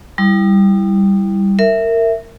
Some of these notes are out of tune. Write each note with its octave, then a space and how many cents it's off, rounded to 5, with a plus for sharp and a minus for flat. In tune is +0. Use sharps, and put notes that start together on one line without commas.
G3 +0 E4 +0
A#4 -20 E5 +0